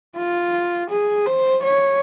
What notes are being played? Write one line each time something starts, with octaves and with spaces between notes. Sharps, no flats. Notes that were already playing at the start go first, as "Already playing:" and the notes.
F4
G#4
C5
C#5